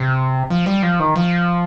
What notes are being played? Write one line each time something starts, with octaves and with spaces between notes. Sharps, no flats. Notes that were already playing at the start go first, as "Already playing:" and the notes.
Already playing: C3
F3
G3
F3
D#3
F3